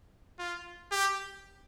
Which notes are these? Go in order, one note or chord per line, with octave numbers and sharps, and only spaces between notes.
F4
G4